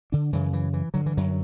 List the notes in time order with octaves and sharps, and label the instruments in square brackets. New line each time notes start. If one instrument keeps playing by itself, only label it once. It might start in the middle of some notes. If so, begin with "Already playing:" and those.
[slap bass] D3 D4
F#2 C#3 E3
E3
E3
G2 D3 F#3
E3
F#2 F#3